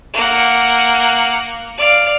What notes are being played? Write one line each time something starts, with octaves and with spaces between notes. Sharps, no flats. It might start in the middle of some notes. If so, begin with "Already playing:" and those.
A#3 F#5
D5 F5